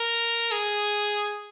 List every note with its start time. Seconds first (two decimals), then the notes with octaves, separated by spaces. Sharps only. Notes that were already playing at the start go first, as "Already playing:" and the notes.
Already playing: A#4
0.52 G#4